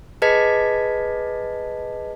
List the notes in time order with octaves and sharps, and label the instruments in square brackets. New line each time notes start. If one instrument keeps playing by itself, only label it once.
[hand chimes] G#4 B4 D#5 A5 G#6 B6